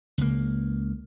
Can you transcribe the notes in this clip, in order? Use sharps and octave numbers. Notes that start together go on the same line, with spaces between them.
C#2 A#3